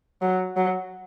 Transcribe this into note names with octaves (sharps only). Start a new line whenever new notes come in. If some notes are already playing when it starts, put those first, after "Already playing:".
F#3
F#3